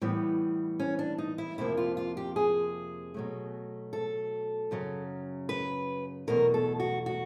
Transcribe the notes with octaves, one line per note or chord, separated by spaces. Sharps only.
A2 E3 G3 B3
C#4
D4
D#4
E4
F2 C3 F3 A#3 E4
F4
F4
G4
G#4
B2 F#3 A3
A4
F#2 C#3 F#3
B4
E2 B2 F#3 A3 A#4
A4
F#4
F#4